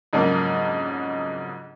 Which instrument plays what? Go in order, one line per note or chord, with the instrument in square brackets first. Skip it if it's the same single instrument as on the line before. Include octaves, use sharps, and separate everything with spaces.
[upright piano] F2 G#2 C#3 F#3 A#3 D4